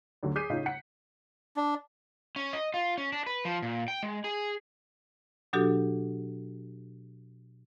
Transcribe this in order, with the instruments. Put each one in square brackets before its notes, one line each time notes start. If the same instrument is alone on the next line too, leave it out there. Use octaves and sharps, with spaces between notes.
[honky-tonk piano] D2 D3 F#3
G#4 D6 G6 B6 C7 D#7
A2 C#3 D#4 F4
F#5 B6 C#7
[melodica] D4
[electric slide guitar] C#4
D#5
F4
C#4
D4
B4
F3
A#2
G5
G#3
G#4
[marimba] B2 F#3 D4 F#4 G4 A4